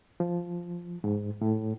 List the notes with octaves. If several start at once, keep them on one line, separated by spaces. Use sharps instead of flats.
F3
G#2
A2